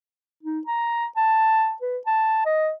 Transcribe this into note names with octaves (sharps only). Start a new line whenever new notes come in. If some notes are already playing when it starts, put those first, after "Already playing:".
D#4
A#5
A5
B4
A5
D#5